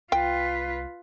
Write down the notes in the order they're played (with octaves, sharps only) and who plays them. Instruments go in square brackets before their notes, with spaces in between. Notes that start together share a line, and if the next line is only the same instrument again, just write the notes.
[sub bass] C2 [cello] F4 B4 [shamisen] G5